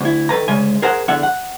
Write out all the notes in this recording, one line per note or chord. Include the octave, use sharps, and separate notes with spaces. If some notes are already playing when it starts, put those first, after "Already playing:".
D2 E4
D#3 A4 B4 A#5
D2 C#3 G#3 E5 G#5
G#4 A#4 C5 F#5
E2 D3 E5 F#5
F#5